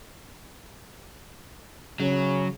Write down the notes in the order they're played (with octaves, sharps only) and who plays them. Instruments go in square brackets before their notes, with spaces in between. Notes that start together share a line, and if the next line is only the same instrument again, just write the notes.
[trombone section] C#3 [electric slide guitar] F#3